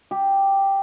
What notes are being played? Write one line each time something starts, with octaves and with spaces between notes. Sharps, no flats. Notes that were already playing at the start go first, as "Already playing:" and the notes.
G4